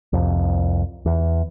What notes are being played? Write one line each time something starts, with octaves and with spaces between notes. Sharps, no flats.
C2 F2
E2